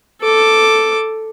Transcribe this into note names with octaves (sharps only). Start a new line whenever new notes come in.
A4 D6